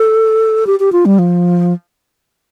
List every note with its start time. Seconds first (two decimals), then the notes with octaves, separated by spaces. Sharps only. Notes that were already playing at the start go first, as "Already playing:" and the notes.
Already playing: A4
0.67 G4
0.80 G4
0.92 F4
1.06 G3
1.19 F3